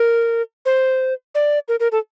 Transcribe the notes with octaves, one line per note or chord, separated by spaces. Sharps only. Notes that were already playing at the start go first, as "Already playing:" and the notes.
Already playing: A#4
C5
D5
A#4
A#4
A4